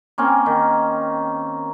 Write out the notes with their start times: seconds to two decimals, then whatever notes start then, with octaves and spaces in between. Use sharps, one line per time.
0.18 A#3 C4 C#4
0.46 D#3